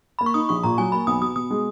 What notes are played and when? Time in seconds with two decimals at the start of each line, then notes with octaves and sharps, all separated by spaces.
0.19 A#3 B5
0.26 C#6
0.34 D#4 D#6
0.49 A#1 C#6
0.63 A#2 A#5
0.78 F#3 G#5
0.92 A#3 B5
1.07 B1 D#6
1.21 B2 D#6
1.36 B2 D#6
1.50 G#3